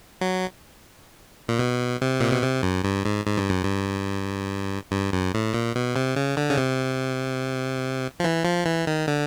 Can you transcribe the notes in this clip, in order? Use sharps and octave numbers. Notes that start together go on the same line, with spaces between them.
F#3
A#2
B2
C3
A#2
B2
C3
F#2
G2
G#2
G#2
G2
F#2
G2
G2
F#2
A2
A#2
B2
C3
C#3
D3
C#3
C3
F3
E3
F3
E3
D#3
D3